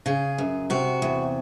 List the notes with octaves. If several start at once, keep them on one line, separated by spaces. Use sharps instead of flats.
C#3 G#4
F#2
C3 F#4
E2